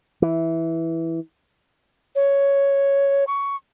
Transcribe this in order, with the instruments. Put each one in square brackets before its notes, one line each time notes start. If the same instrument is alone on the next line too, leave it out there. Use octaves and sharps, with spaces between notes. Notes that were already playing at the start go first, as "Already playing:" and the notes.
[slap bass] E3
[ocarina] C#5
C#6